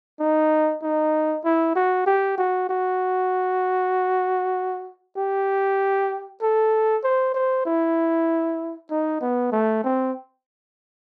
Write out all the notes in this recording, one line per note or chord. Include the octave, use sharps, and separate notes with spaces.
D#4
D#4
E4
F#4
G4
F#4
F#4
G4
A4
C5
C5
E4
D#4
B3
A3
C4